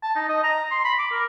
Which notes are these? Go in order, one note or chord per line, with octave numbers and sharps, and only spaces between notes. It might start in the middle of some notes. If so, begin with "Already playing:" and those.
A5
D#4
D#5
A#5
C6
B5
D6
A#4